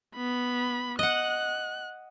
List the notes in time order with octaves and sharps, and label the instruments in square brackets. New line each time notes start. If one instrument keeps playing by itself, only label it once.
[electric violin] B3 B5
[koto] D#5 F#5 [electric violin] F#6